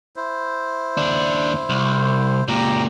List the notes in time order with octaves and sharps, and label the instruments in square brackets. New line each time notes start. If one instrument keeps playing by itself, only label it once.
[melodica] E4 C5
[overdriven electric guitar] D#2 D4
C2
[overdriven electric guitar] C#2 A#2 [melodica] G4 A#5